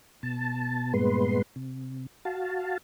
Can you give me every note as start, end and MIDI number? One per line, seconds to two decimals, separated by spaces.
0.23 0.93 47
0.23 0.93 81
0.93 1.42 43
0.93 1.42 46
0.93 1.42 56
0.93 1.42 59
0.93 1.42 71
0.93 1.42 84
1.56 2.06 48
2.25 2.78 66
2.25 2.78 77
2.25 2.78 81